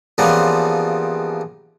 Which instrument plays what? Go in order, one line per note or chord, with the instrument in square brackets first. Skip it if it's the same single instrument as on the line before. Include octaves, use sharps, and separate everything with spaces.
[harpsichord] C#3 E3 F3 G3 A#3 B3